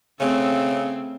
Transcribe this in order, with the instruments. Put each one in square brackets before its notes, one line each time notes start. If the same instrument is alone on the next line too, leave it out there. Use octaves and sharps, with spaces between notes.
[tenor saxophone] C#3 [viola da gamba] A3 C4